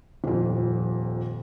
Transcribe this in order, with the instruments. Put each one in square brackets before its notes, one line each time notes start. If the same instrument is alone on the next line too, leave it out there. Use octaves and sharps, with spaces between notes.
[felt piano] D#1 F2